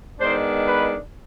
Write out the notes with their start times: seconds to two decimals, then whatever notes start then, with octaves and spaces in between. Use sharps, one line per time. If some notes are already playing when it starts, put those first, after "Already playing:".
0.19 D#3 G#3 B3 D4 C5
0.67 B4